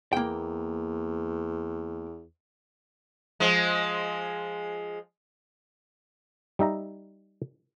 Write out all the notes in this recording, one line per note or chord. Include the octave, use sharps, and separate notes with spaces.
E2 A#3 G5
F3 G#3
G3 D#4 E5 A#5